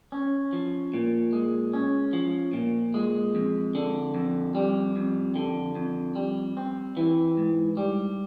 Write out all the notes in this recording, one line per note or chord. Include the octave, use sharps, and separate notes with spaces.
C#4
F3
A#2
G#3
C#4
F3
A#2
G#3
F2
D3
F2
G3
F2
D3
F2
G3
C4
E3
G#2
G3